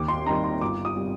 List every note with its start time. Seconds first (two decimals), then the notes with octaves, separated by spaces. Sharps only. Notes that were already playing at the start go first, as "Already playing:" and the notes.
Already playing: D#2 D6
0.08 C6
0.26 D#3 G3 C4 D#4 A#5
0.44 C6
0.61 G1 D6
0.85 D#6
0.97 C3 G3